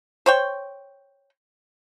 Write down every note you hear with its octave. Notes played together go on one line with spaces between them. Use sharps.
C5 C#5 G5